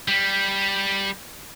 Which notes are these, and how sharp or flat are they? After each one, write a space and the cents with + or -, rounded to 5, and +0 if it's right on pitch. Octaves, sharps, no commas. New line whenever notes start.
G3 +0